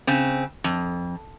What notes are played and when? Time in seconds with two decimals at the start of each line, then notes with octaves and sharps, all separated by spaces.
0.07 C#3 C4
0.64 F2